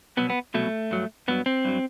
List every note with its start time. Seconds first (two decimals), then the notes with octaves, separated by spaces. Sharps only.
0.17 C2 B2 F#3 B3
0.30 B3
0.54 C2 B2 F#3 A3
0.91 G2 F#3
1.28 G2 F#3 B3
1.46 C4
1.65 G2 F#3